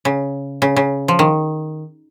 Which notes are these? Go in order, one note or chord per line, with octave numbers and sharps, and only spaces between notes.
C#3
C#3
C#3
F3
D#3